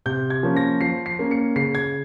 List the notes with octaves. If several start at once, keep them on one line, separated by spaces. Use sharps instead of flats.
C3 G6
G#6
F3 A#3 C#4
A#6
F3 C7
C7
A#3 C#4
C#7
C#3 C7
G#6